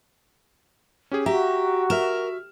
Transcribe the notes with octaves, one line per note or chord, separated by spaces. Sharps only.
C#4 G4 G#4
F#4 G4 E5 A#5
A#4 E5 F6 E7